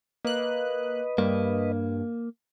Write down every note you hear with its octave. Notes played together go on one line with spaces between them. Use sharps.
A#3 B4 D#5 F#6
G2 A#3